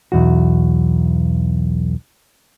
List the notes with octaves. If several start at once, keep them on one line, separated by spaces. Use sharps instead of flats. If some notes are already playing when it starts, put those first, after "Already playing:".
B1 E2 F#4